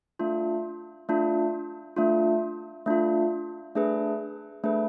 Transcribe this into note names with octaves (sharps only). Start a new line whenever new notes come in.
A3 D4 F4
A3 D4 F4
A3 D4 F4
A3 D4 F4
A3 D4 G#4 B4
A3 D4 G#4 B4